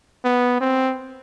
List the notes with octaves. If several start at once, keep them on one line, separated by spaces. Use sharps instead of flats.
B3
C4